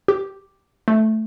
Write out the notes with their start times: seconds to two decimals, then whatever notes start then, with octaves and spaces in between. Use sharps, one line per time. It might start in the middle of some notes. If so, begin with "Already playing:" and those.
0.08 G4
0.88 A3